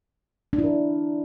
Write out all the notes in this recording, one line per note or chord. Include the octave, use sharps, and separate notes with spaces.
D4
E4
A#4